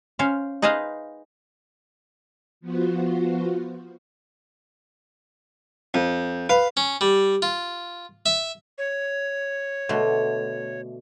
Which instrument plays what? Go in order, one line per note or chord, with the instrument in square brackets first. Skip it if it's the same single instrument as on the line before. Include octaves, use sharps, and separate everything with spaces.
[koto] C#4 C5 F5
D#4 G#4 B4 C5 D#5 F5
[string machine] F3 B3 F4 F#4 C5
[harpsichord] F2
[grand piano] B4 [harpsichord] F5
[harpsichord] C#4
G3
F4
E5
[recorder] C#5
[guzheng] B2 D3 A3